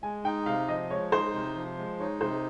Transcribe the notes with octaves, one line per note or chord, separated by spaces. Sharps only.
G#3 G#5
D#4 G5
C3 F5
F3 D#5
G#3 C#5
D#4 C5
C3
F3
G#3
D#4 C#5
C3 C5